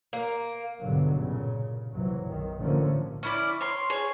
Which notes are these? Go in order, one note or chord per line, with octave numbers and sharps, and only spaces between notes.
A#3
B1 G2 B2 D3 F#3
A#2 C#3
F#1 C2 E3 F#3
B1 D#3
A1 D3 F3 A3 A#3 C#4
C#4 E4 D5
C#5 C6
G#4 C#5